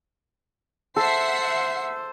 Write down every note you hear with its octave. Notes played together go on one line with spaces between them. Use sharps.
A4 C5 E5 F#5 C7